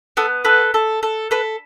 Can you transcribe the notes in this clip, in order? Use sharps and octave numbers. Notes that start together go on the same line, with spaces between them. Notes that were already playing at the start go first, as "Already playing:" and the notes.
B3 A4
A4 B4
A4
A4
A4 B4